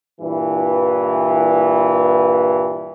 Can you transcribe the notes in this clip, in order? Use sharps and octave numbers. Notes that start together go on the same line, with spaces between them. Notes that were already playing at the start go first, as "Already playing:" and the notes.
G2 A#2 E3